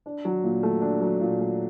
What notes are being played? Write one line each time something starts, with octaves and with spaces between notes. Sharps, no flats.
D4
F#3
A#2
A3
D4
F#3
A#2
A3